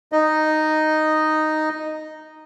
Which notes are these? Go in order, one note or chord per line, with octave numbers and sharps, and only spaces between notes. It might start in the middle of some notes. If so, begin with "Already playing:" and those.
D#4 D#5